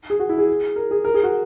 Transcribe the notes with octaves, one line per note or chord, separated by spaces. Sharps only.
G#4
F#4
E4
G#4
A#4
G#4
A#4
G#4
F#4